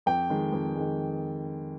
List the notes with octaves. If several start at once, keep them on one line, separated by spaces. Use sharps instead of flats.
F2 G5
D#3 G#3
F2
D#3 G#3